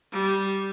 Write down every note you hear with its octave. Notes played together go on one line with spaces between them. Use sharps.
G3